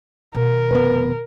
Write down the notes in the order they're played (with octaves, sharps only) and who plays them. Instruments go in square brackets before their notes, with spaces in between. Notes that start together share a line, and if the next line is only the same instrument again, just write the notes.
[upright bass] B2 D#3 [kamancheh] A#4
[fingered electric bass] F1 B3 [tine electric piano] B4